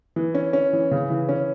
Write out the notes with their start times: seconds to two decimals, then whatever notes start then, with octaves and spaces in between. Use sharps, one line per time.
0.16 E3
0.34 C#4
0.53 C#4
0.73 E3
0.91 C#3
1.10 E3
1.29 C#4